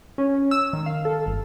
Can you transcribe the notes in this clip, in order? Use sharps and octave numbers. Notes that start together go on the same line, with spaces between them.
C#4
E6
D#3
F5
A4
G1